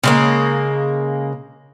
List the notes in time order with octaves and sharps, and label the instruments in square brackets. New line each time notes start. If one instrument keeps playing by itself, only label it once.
[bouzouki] C#3 G#3 A#3